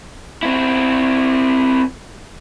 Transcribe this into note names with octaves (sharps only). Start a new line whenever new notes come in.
C4 E4